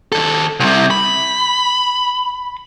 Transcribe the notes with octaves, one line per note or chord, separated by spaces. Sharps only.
D#2 A4
C2 C3
B5